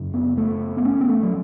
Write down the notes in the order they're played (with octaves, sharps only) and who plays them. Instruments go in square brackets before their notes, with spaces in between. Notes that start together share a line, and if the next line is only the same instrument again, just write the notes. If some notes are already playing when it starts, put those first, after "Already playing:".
Already playing: [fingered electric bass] F#2 C#3
B3
A3
B3
C#4
B3
A3
F#3